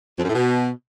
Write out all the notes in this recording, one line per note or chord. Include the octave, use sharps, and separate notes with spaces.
F2
F#2
A2
B2